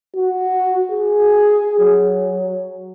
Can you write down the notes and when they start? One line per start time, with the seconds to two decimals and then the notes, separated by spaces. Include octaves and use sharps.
0.16 F#4
0.91 G#4
1.80 F#3